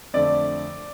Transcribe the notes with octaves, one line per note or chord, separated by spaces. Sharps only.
F2 D3 A3 D5